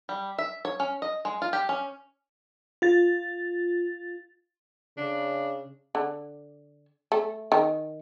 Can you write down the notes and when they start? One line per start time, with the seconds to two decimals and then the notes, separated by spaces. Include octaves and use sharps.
0.09 G3
0.38 E5
0.65 C#5
0.80 C#4
1.02 D#5
1.25 G#3
1.42 F4
1.53 G4
1.69 C#4
2.82 F4 A6
4.97 C#3 D4
5.95 D3
7.12 A3
7.52 D#3